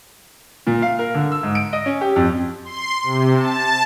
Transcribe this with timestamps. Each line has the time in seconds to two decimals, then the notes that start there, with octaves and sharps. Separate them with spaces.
0.67 A#2
0.82 F5
0.99 A#4
1.14 D3
1.32 E6
1.43 G#2
1.55 D7
1.73 D#5
1.86 C#4
2.01 G4
2.16 F2
2.65 C6
3.03 C3
3.36 A5